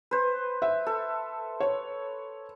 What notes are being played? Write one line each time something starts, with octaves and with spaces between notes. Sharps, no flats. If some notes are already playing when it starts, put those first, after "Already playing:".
B4 C5
E5
A4
C#5